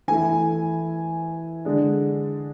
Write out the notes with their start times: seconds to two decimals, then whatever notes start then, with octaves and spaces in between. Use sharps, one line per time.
0.08 E3 A3 E4 G#5
1.65 D3 G#3 D4